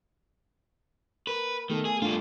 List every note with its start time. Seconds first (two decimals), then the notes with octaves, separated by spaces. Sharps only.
1.27 A#4 B4
1.70 D#3 A3 B3 A4
1.85 G#4
2.02 G2 A3 D4 F4